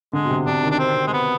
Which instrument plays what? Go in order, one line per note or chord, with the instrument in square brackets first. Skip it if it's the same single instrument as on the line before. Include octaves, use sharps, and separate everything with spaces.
[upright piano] D3 [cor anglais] G#3
[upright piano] B2
C3
[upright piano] C3 [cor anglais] D4
[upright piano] D#3
[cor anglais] D4
C4
G#3
B3